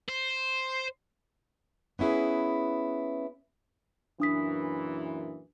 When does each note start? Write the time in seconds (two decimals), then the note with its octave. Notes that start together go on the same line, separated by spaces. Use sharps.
0.08 C5
1.99 B3 C#4 E4 G#4 B4
4.20 F#2 A#2 E3 D4 D#6 B6